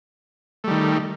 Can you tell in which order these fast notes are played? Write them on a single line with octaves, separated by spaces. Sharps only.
A3 G3 D#3